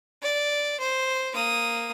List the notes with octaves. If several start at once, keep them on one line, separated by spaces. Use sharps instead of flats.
D5
C5
A#3 D#6